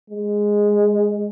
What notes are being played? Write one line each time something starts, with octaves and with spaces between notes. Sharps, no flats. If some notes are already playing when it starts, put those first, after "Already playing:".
G#3